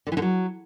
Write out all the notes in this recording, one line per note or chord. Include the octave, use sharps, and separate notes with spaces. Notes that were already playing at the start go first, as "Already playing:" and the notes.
D3
E3
D3
F#3